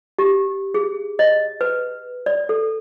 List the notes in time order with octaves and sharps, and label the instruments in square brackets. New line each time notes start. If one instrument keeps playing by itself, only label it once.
[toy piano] G4
G#4
D#5
B4
D5
A4